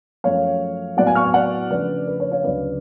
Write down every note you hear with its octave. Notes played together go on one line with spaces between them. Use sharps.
F#2 F3 A3 C#5 F5
A2 F#3 B3 D5 F#5
F5 G#5
C#6 F6
F5 G#5
D5 F#5
C#3 F3 A3 D4 B4 D5
B4
C#5
C#5 F5
D2 C#3 F#3 C#4 B4 D5